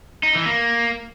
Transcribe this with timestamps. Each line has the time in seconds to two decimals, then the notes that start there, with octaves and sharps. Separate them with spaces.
0.23 D#4
0.35 E3
0.46 A#3